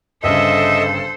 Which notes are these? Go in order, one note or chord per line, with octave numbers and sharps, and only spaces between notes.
G1 G2 C#3 A4 C5 D#5 E5